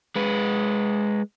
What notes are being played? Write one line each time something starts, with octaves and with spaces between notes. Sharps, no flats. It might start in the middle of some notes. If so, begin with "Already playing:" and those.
G#3 B4